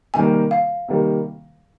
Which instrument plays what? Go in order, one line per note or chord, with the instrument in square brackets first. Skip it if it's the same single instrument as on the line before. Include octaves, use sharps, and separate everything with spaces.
[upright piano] C3 D#3 G3 A#3 [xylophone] G#5
[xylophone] F5
[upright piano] C3 D#3 G3 A#3